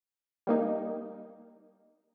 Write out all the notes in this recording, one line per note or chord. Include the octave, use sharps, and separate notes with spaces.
G3 A#3 D#4